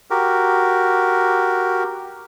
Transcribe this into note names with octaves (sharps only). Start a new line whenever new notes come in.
F#4 G4 A#4